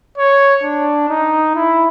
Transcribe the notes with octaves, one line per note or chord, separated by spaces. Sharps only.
C#5
D4
D#4
E4